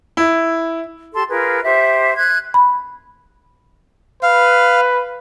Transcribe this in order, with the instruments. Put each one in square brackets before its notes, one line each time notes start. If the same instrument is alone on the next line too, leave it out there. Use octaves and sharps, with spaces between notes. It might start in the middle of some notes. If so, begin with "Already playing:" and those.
[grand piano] E4
[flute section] G4 A4 A5 C6
F4 G#4 A#4 B4
G4 C5 E5
F#6 G#6
[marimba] B5
[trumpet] B4 [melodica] F5